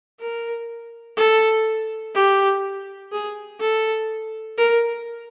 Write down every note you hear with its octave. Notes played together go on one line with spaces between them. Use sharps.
A#4
A4
G4
G#4
A4
A#4